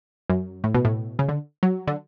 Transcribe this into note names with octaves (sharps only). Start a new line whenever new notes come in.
F#2
A2
B2
A2
C#3
D3
F#3
D3